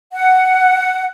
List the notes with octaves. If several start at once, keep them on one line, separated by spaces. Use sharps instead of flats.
F#5